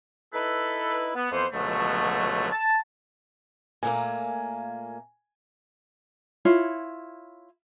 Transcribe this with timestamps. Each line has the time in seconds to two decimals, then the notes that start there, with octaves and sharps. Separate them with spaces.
0.33 D#4 E4 A4 B4
1.15 B3
1.32 F2 E3 B3 C5
1.53 C#2 B2 D3 F3 F#3 A3
2.52 A5
3.83 A#2 A3 A#3 G#5
6.45 E4 F4 C#5